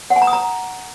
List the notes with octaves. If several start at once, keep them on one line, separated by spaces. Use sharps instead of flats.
F#5
G#5
A#5
D#6
A#5